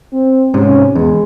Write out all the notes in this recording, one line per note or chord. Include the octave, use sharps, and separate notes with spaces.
C4
G#2 C3 C#4
E2 G#3